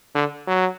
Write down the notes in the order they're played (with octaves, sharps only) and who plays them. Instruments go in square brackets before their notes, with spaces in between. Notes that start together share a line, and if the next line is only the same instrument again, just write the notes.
[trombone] D3
F#3